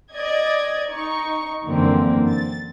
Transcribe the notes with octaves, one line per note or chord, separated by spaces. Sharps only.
D5 D#5 G#6
D#4 C#6
F#2 D3 E3 F3 A#3 C4
A6